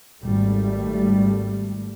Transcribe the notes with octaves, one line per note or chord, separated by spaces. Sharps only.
G#1 G3 A3